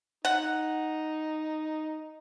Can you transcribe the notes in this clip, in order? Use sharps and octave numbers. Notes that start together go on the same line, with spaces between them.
D#4 F#5